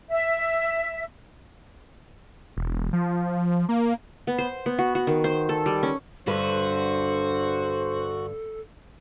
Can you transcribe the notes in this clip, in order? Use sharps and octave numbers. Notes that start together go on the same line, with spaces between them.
E5
E1
F3
A#3
B3
C5
B3
F#4
F#4
D#3
C5
A4
G3
C#4
G2 D3 F#4 A4 B4 C5